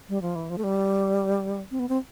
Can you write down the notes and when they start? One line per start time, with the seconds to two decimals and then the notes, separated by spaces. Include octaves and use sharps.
0.09 G3
0.22 F3
0.35 E3
0.50 F3
0.58 A3
0.64 G3
1.71 C4
1.79 B3
1.89 C4